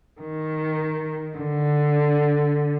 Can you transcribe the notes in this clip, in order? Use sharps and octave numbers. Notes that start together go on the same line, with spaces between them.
D#3
D3